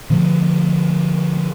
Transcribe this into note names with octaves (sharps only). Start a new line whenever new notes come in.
B2 D3 F3 A3